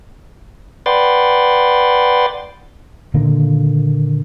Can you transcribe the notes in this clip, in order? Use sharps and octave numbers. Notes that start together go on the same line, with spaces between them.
B4 D5 F#5 G5 C6 A6
A#2 D3 D#3 A#3